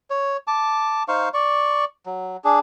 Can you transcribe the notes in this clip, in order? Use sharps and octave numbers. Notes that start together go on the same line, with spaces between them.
C#5
A5 D6
D#4 C5 F5 C#6
D5 C#6
F#3
D4 G#4